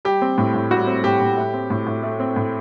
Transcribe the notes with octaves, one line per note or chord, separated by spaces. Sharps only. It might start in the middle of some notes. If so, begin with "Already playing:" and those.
G3 G4
C4
A2
A2
G3 F#4
C4
A2 G4
A2
A3
C4
A2
A2
A3
C4
A2